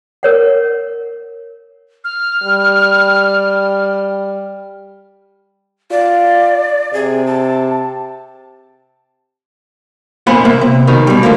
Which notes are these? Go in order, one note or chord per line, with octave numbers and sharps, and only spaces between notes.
A#4 C#5 F#5
F6
G3
F4 D5
C3 G#4
A5
F2 A#2 B3 C5 F#5 B5
C2 A#3 E5
C3
B2 D#3 D#4
B2 G3
F#2 D3 F3 A3 A#3